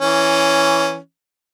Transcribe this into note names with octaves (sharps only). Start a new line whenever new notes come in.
E3 C#4